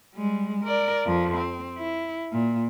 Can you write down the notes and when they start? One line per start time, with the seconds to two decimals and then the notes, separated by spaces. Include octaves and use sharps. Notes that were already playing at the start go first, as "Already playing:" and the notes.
0.14 G3 G#3
0.64 A#4 D5
1.06 F2 F3
1.37 C4
1.78 E4
2.32 A#2